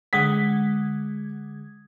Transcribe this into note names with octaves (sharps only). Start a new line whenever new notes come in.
D3 G#3 F#5 D#6 G#6 B6